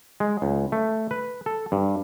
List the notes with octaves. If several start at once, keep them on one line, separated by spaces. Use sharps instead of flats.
G#3
C#2
A3
B4
A4
G2